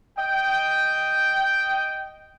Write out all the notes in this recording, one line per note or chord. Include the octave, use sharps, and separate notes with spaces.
D#5 G5